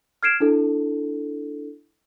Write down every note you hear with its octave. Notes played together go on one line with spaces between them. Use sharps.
F6 G#6 C7 D7 E7
D4 E4 A4